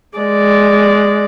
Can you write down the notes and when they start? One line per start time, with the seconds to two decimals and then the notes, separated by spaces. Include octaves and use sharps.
0.18 G#3 D5